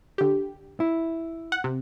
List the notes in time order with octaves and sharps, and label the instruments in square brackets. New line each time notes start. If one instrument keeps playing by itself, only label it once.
[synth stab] D3 G4
[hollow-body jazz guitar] E4
[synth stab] F#5
C3